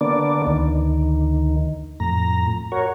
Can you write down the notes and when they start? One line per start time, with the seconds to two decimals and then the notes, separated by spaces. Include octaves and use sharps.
0.01 D3 A#3 B3 D4 D5
0.46 D2 D#3
2.00 F2 A2 A#5
2.72 F#4 A#4 C#5